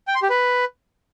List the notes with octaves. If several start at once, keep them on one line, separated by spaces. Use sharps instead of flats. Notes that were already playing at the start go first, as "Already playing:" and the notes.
G5
C6
G4
B4